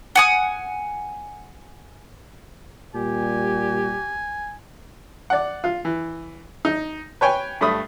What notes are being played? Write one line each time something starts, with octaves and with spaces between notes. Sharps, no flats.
F#5 G#5 D#6
A#2 G3 G4 G#5
D5 F#5
F4
E3
D#4
B4 C#5 G5 G#5
G2 A3 B5 D#6